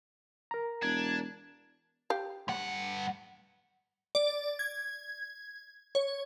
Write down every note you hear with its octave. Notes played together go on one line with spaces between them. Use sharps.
A#4 A#5
E1 D4 G#6
G4 F5
G2 F#5
D5
G#6
C#5